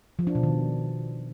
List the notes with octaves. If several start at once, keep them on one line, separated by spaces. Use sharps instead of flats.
F3
D4
B2
D#3